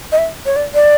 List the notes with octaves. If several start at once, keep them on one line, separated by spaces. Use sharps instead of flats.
D#5
E5
C#5
D5
D5